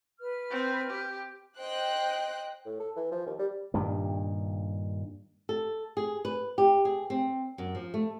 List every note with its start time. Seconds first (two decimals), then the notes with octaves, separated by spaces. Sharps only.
0.19 B4 F6
0.51 C4
0.90 G4
1.59 C5 D#5 G5 F#6
2.65 A2
2.80 A4
2.97 E3
3.12 F3
3.26 D#2
3.39 G3
3.74 G2 A#2 D#3
5.49 A4
5.97 G#4
6.25 B4
6.58 G4
6.85 G#4
7.10 C4
7.58 F#2
7.75 F3
7.94 A3